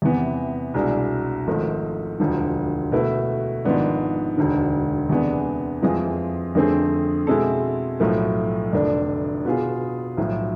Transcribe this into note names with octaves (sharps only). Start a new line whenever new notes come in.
E2 C3 E3 B3
C2 B2 G#3 D4
G#1 G#2 F3 A3
E1 D2 D3 F3
B2 A3 E4 B4
G#1 G#2 F3 B3 D4
E1 D2 D3
E2 C3 G#3 B3 D4
F2 E3 G#3 C4 F4
F2 D3 A3 C4 G#4
B2 G#3 C4 E4 A4
B1 A2 F3 A3
F1 F2 D3 A3 D4
B2 B3 F4 G#4
B1 A2 F3